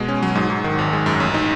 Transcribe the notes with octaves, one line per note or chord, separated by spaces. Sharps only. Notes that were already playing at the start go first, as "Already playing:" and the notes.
Already playing: B2 G#3
C#4
F#3
G#2
G#2
D#3
G#1
G#3
F#2
A1
D#4